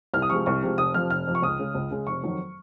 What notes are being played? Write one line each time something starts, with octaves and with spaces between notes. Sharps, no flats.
C2 F6
D#6
C3 F3 G#3 C#6
C2 C#6
C3 F3 G#3
F1 D#6
F2 C3 F3 F6
F1 F6
F2 C3 F3
C#6
C#2 D#6
C#3 G#3
C#2
C#3 G#3
F1 C#6
F2 D#3 F#3